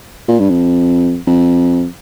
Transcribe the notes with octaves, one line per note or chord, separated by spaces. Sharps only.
A#2
G2
F2
F2